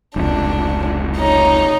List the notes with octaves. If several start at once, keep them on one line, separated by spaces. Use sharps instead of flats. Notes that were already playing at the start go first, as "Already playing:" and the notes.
F1 C#2 D4
D#4 C#5